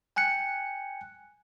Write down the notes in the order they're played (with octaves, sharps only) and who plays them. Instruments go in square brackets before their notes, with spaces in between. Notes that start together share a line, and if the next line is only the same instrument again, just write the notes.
[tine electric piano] G5 G#5 F#6 C#7